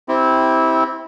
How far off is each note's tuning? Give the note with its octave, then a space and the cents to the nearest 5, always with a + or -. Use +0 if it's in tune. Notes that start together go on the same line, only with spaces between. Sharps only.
C4 +0 E4 -20 G4 -5